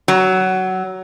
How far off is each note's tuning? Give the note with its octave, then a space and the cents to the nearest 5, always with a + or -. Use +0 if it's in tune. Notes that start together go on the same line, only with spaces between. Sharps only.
F#3 +15